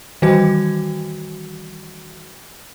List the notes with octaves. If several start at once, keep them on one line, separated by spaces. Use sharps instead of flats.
D#3 E3 G3 F#4 G#6